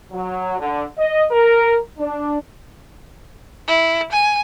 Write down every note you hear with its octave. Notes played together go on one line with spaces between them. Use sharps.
F#3
D3
D#5
A#4
D4
E4
G#5